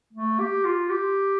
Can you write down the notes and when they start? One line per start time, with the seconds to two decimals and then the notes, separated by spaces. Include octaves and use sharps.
0.13 A3
0.39 G4
0.65 F4
0.90 G4